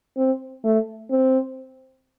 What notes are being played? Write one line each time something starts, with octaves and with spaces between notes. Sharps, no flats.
C4
A3
C4